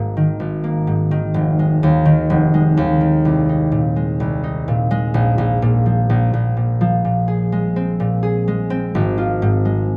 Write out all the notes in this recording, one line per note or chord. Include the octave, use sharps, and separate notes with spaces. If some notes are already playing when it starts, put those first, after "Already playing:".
Already playing: G#1 G#2 A#3
D#3
G#1
A#3
G#2
D#3
F1
G#3
D#2
D#3
F1
G#3
D#2
D#3
C2
D#4
A#2
G#3
C2
D#4
A#2
G#3
A#1
A#1
A#2
F3
A#1
A#1
A#2
F3
A#2
G#4
G#3
C4
A#2
G#4
G#3
C4
G#1
F4
G#2
G#3